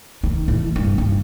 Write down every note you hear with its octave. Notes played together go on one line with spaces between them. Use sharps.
D#3
A1
G2
G2